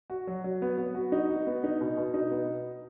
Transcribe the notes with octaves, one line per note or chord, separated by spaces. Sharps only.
F#4
F#3
F#3
B3
B3
F#4
D#4
F#4
B3
D#4
B2
B2
D#4
B3